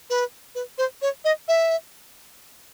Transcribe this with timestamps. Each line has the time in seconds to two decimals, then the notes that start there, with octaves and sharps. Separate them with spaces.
0.10 B4
0.55 B4
0.78 C5
1.02 C#5
1.25 D#5
1.48 E5